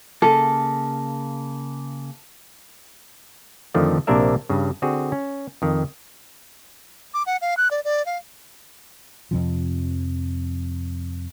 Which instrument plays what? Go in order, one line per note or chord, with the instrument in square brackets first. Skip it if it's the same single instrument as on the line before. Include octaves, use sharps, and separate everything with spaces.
[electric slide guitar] C#3 A#3 [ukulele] A4
[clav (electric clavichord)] F2 D3 D#3 F3 A3
A#1 C3 A#3 D4 A#4 E5
G2 C#3
D3 C4 F#4 G#4
C#4
F2 D#3
[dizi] D6
F#5
F5
F#6
D5
D5
F5
[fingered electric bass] F2 C3 F3